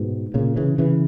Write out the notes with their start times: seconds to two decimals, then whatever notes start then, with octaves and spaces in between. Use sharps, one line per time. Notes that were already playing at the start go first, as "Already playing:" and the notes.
Already playing: G#2 B2
0.34 A#2 C#3
0.57 C#3 E3
0.78 C#3 E3